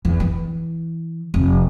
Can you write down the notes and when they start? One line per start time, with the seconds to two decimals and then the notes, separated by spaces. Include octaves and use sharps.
0.05 E2
0.20 E3
1.34 F1